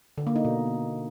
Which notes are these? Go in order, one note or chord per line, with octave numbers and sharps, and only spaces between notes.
D3
A#3
D#4
B2